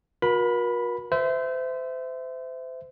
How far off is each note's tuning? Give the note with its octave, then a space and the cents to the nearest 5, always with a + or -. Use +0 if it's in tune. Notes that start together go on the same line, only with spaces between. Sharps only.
F#4 -40 A#4 +40 B5 +0
C5 -35 E5 +0